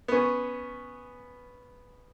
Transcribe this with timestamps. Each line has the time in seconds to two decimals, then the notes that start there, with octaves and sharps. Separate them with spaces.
0.08 B3 C#4